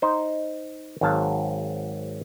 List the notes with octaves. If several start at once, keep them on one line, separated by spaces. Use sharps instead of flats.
D#4 C5
G#1 G#2 F#3 F5 A5